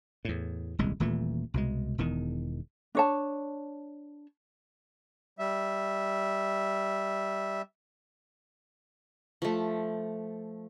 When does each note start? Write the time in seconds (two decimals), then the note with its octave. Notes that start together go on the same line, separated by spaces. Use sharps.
0.25 E2 A2
0.79 D#1 C2 G#3
1.00 D#1 A#2 E3 A3
1.54 C2 B2 G#3
1.98 E1 E2 D#3
2.95 D4 C#5 A5
5.39 G3 E5
9.42 F3 A3